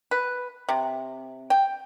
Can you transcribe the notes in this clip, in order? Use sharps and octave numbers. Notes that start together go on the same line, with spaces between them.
B4
C3
G5